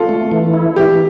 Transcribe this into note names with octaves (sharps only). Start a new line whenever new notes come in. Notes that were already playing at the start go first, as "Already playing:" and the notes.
Already playing: F4 A4
A3
E3
E4
E3 G4